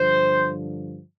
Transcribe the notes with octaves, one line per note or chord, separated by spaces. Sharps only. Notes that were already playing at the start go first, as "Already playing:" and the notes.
Already playing: G2 D3 F3 C5